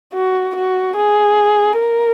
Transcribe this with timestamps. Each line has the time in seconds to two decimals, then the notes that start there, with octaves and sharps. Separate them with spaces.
0.14 F#4
0.55 F#4
0.96 G#4
1.79 A#4